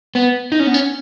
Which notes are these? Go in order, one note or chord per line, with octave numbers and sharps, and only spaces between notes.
B3
D#4
C#4
B3
C#4